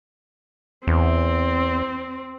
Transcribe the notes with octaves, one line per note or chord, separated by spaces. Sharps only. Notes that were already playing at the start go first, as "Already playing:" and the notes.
E2 C4